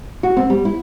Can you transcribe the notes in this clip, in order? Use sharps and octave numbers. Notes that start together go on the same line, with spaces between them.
F#4
C4
G3
E4